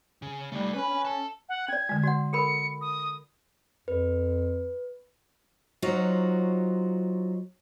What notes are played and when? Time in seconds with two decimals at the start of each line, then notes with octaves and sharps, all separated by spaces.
0.22 C#3
0.52 G3 A3 D#4
0.74 C#4 B4 B5
0.90 C#4
1.05 A4 A5
1.49 F#5
1.68 C#4 D5 G#6
1.89 D3 G#3
2.03 F#4 D5 F#5
2.33 A4 A#4 B5 C#7
2.81 D#6
3.88 F2 B4
5.82 F#3 D#4 F4 F#4 C5 C#5